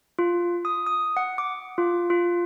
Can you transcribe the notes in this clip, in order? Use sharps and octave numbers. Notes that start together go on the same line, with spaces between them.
F4
D#6
D#6
F#5
D6
F4
F4